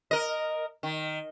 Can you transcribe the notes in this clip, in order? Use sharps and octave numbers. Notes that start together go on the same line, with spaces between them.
A#4 D#5
D#3